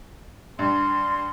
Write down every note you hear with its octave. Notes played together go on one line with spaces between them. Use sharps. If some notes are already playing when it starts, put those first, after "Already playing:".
G2 C6